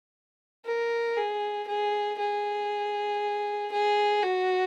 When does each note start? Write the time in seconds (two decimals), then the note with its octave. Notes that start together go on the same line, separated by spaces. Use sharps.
0.66 A#4
1.16 G#4
1.67 G#4
2.19 G#4
3.72 G#4
4.22 F#4